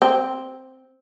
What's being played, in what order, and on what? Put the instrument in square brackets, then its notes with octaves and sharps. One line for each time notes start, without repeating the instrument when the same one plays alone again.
[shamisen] C4